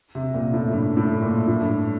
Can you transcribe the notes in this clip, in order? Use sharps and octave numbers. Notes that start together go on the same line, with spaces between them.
C3
A#2
A2
G2
A2
A#2
A2
G2